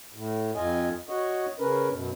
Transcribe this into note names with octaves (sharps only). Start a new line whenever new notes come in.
A2
F2 F4 D#5 G#5
F#4 C#5 D#5 F#5
C#3 C#4 A#4 B4
F#2 B2